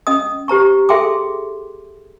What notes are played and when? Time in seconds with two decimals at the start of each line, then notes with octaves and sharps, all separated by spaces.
0.07 C#4 D#5 D#6
0.48 G4 C5 A#5 C#6
0.89 G#4 A4 E5 G5 C6 D6